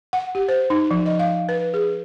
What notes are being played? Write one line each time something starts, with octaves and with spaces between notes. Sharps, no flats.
F#5
G4
C5
D#4
F3
D#5
F5
B4
G#4